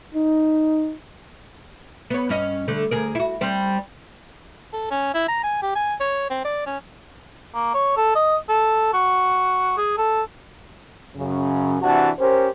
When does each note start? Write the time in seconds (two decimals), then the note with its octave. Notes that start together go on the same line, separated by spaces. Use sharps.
0.14 D#4
2.10 B3 C#5
2.29 G2 C#4 D#5
2.68 D3 A3
2.91 D2 G#4 A#4
3.15 E4 F#4
3.41 G3 C4
4.73 A4
4.91 C#4
5.14 E4
5.28 A#5
5.43 G#5
5.62 G4
5.75 G#5
6.00 C#5
6.30 C4
6.45 D5
6.66 C#4
7.54 A#3
7.74 C#5
7.97 A4
8.15 D#5
8.49 A4
8.93 F#4
9.77 G#4
9.98 A4
11.16 F#2 C#3
11.81 C3 E3 D4 F#4 F#5 A5
12.19 C#4 G4 A#4 C5